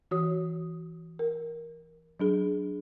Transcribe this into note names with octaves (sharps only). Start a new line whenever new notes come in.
E3 F#4 C#5 D#6
A#4
F#3 D4 G#4